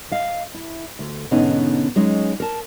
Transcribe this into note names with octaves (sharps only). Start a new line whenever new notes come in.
D#5 F5
E4
D2
G#2 B2 D3 B3 C#4 D#4
F#3 G#3 C#4 D#4
A#4 A5